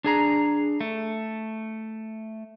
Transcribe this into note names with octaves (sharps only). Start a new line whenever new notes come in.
D4 G#4 A#5
A3